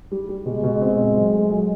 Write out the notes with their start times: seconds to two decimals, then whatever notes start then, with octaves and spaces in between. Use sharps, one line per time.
0.12 G3
0.29 G3
0.46 B2 G#3
0.63 B2
0.82 C4
0.99 A#2
1.16 F#3
1.34 A3
1.51 F#3